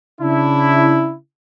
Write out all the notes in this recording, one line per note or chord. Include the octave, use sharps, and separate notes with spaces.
C#3 D4 E4